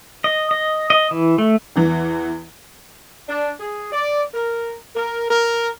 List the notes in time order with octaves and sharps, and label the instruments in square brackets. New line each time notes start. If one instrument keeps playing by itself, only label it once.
[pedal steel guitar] D#5
D#5
D#5
E3
A3
[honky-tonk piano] E2 E3
[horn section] D4
G#4
D5
A#4
A#4
A#4